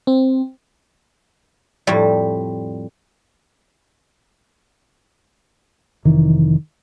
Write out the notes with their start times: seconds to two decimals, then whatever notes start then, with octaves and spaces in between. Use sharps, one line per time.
0.07 C4
1.87 F2 A2 G3
6.05 F1 D#3 E3